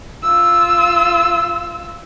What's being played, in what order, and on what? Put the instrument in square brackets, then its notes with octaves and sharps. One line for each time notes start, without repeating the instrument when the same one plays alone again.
[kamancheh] F4 E6